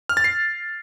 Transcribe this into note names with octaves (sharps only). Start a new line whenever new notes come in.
F6
A6
C7